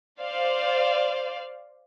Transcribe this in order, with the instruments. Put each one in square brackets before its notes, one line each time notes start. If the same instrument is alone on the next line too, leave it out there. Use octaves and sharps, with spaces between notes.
[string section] C5 D5 F5